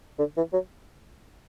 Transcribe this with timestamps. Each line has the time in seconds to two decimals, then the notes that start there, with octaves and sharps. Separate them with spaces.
0.19 D3
0.37 E3
0.53 F#3